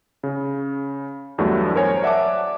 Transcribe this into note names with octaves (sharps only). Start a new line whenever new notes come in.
C#3
E2 G2 F#3 A3
A#4 C5 C#5 G#5
D5 E5 F#5 A5 D6